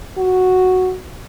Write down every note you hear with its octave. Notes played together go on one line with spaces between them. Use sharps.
F#4